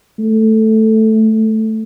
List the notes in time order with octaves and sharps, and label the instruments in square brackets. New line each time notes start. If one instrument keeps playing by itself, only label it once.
[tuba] A3